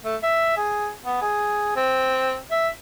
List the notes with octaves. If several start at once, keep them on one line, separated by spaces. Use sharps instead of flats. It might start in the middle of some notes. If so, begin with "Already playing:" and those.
A3
E5
G#4
B3
G#4
C4
E5